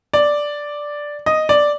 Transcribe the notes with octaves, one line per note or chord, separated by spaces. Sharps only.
D5
D#5
D5